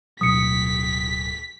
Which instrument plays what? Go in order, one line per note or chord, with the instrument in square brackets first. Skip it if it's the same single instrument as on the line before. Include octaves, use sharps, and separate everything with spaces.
[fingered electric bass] D1 B2 F#3 [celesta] D#6 C#7 [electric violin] B6